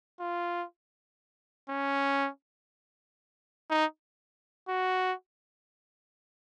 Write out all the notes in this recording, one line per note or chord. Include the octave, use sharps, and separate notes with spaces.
F4
C#4
D#4
F#4